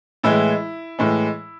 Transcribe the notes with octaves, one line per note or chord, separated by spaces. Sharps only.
A2 E3 G#3 E4
A2 E3 G#3